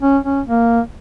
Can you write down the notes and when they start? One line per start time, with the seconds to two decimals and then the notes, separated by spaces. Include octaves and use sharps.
0.01 C#4
0.24 C#4
0.47 A#3